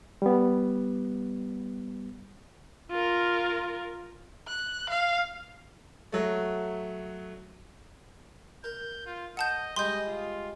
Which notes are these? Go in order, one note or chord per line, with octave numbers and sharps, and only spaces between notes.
G3 B3
F4 A#4
F#6
F5
F#3 A3
A#4 G6
F4
D#5 F#5 A5 G6
G3 G#3 D#5 C6 G6
F4